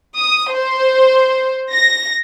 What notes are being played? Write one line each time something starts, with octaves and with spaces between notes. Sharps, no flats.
D#6
C5
A#6